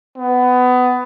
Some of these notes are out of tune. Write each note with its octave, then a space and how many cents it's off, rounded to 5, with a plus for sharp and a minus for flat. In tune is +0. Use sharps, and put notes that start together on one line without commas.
B3 +20